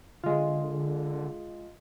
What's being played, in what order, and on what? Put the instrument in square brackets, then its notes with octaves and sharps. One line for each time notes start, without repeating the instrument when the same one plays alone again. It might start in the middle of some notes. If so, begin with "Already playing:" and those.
[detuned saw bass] D3 [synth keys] G#3 F4